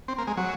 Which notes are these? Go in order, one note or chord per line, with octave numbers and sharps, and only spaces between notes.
C4
A#3
G#3
F#3